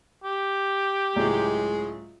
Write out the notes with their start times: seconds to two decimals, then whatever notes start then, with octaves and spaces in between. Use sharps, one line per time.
0.24 G4
1.16 C#2 A2 F#3 G#3